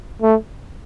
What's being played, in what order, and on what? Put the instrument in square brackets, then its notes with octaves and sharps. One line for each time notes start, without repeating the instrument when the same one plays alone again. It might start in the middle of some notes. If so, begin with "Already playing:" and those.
[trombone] A3